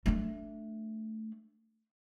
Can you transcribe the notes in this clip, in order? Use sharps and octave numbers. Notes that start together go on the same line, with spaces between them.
A3 D4